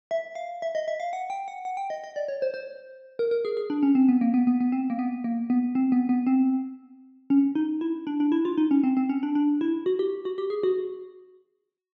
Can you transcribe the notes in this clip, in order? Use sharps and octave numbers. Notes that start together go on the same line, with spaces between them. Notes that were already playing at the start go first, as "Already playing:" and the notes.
E5
F5
E5
D#5
E5
F5
F#5
G5
F#5
F#5
G5
D#5
D#5
D5
C#5
C5
C5
A#4
A#4
G#4
G#4
D4
C#4
C4
B3
A#3
B3
B3
B3
C4
A#3
B3
A#3
B3
C4
B3
B3
C4
C#4
D#4
E4
D4
D4
E4
F4
D#4
C#4
C4
C4
C#4
D4
D4
E4
F#4
G4
F#4
G4
G#4
F#4